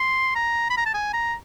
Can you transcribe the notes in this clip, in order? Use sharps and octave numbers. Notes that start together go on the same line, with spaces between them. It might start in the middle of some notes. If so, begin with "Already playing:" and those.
Already playing: C6
A#5
B5
A#5
A5
G#5
A#5